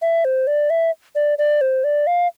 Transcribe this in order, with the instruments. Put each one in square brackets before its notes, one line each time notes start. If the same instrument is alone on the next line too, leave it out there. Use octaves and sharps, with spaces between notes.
[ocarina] E5
C5
D5
E5
D5
D5
C5
D5
F5